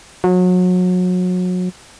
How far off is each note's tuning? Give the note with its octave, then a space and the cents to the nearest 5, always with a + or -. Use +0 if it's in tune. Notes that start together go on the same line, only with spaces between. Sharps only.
F#3 -30